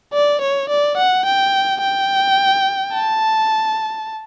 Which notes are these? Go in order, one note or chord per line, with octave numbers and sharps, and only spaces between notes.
D5
C#5
D5
F#5
G5
G5
A5